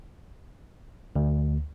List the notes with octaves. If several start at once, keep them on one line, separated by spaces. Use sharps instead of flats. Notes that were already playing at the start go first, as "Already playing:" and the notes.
D2